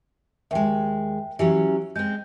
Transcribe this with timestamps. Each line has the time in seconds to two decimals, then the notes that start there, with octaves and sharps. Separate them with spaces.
0.51 D#2 G#3 E5 G5
1.39 E3 F#3 C#4 G4
1.96 G#3 C4 G6